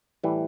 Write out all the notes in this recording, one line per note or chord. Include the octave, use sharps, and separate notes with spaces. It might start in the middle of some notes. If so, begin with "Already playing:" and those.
A2 E3 G3